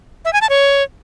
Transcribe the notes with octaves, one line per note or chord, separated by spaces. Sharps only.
E5
G#5
A5
C#5